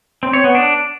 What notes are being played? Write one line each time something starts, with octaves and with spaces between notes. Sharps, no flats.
C4
C#5
B3
D4